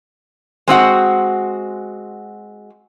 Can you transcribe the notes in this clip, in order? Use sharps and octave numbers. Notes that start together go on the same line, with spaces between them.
G#3 C4 F#4 F#5